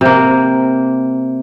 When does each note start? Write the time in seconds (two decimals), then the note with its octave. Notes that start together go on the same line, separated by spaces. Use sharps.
0.01 C3 A#3